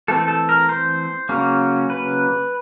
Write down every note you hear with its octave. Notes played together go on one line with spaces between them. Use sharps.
E3 A3 C4 A4
A4
A#4
C5
C#3 F#3 A#3 C#4
B4